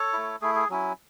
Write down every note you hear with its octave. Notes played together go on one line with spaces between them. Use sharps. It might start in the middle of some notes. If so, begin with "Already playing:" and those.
Already playing: A4 C#5
A3 E4
A3 E4 G#4
G#4
F#3 C#4 E4